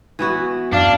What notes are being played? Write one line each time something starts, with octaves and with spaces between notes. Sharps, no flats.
E3 B3 F#4
F#2 D4 F5